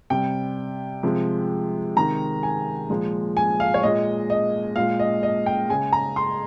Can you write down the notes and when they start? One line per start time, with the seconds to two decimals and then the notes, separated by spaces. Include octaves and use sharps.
0.10 C3 G3 G5
1.03 C3 F3 G#3
1.96 C3 D#3 G#3 A#5
2.43 G#5
2.90 A#2 F3 G#3
3.37 G#5
3.60 F5
3.74 C#5
3.83 A#2 G#3 D#5
4.30 D#5
4.76 A#2 G#3 F5
4.99 D#5
5.23 D#5
5.46 G5
5.69 C#3 G#3 G#5
5.93 A#5
6.16 C6